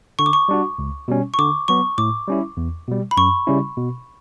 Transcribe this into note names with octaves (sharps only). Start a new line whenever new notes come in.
D3 C#6
D6
C#6
G3 D4 F#4
C#2
B2 G3 C#4
C#6
D3 D6
F#3 B3 C#6
A2 D6
G3 C#4 E4
E2
B2 G3
B5
F#2 C#6
C#3 G3 C#4 E4
B2